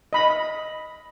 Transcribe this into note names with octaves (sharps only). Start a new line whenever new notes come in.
D#5 B5